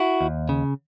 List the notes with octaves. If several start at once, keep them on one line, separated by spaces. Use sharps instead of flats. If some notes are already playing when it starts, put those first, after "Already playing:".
Already playing: E4 F#4
D#2
C#3